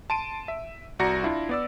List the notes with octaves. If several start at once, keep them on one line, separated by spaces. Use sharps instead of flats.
A5 C6 D7 D#7
E5
C2 F#4 D5 A#5 A#6 C#7
D4 E4 F4
B3 D5 E6